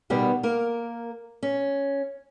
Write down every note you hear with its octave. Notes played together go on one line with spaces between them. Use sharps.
B2 D#3 G3 B3 G4
A#3 A#4
C#4